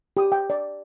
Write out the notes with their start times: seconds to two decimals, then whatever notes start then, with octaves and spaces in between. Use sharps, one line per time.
0.17 G4 D#6
0.32 G5
0.50 D5